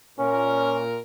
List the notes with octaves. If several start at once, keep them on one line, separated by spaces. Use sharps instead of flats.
A#2 C#4 A#4